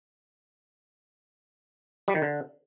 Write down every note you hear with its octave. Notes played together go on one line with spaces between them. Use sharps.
G3
D#3
D3